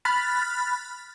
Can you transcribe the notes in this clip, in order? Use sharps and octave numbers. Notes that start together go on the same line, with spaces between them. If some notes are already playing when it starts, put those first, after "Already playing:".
B5 F6 F#6 A6 B6